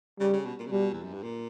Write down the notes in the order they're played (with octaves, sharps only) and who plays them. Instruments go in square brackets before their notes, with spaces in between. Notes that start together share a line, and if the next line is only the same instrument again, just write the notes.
[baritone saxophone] C#3 [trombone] G3
[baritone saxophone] C#3
B2
A#2
C#3
[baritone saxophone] B2 [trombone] G3
[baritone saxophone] E2
F#2
G2
A#2